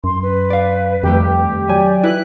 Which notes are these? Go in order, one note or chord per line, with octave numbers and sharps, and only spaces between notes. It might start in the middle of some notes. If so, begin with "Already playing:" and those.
F#2 C6
B4
D5 F5
F2 D#3 G3 A3 G4
F#3 D5 G#5
E4 B4 D#5 F#6